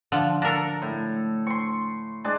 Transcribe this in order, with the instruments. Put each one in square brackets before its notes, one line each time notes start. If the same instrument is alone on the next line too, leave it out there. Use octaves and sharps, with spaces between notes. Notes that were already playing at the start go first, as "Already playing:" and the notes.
[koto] D3 F3
[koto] D4 A#4 [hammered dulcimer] A4 A#5
[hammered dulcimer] A2
C6 C#6
G#3 D4 D5